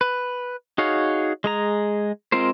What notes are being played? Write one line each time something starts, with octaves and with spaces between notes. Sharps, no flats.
B4
D#4 F#4 G#4 C#5 F5
G#3 G#4 A#5
G#3 C4 F4 A#4 C5